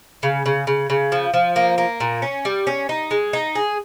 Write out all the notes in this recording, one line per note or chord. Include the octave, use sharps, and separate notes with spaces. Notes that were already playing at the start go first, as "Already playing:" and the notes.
C#3
C#3
C#3
C#3
F3
F3
A#3
A#3
A#2
C#4
G3
C#4
D#4
G#3
D#4
G#4